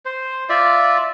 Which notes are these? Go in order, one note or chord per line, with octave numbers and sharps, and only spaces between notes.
C5
F4 D5 E5